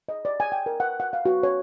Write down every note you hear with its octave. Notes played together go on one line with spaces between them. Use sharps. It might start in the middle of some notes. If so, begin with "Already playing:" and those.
D#5
D5
G#5
G5
A#4
F#5
F#5
F5
F#4
C#5